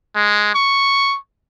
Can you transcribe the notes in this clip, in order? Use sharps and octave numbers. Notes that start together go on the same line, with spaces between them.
G#3
C#6